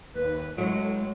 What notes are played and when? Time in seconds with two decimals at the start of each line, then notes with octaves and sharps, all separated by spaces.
0.15 D#2 B4
0.58 A2 F#3 G#3